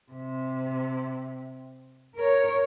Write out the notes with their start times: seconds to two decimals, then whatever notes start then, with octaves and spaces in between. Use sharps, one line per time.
0.13 C3
2.15 A#4 C#5